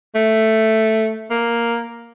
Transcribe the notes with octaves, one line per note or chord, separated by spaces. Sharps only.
A3
A#3